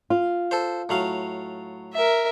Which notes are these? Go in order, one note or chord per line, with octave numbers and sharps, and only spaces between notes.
F4
A4 C5
A2 F#3 F5
A#4 E5